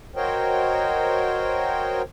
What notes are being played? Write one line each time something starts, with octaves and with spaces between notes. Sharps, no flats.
F#4 A#4 C5 C#5 D#5 G5